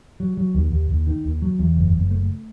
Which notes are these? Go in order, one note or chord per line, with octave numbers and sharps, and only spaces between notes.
F#3
F#3
D#2
D#2
D#2
D#3
D#2
F#3
E2
F#1
F#1
A3